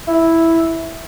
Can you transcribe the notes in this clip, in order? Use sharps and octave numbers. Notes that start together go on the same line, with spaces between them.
E4